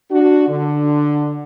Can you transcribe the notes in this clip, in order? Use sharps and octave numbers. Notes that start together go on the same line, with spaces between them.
D4 F#4
D3